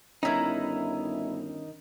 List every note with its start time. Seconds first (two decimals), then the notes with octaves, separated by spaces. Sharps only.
0.23 G1 D#3 C#4 D#4 E4 A#5